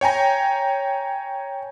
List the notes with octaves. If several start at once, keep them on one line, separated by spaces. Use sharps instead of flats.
C#5 G5 G#5 A#5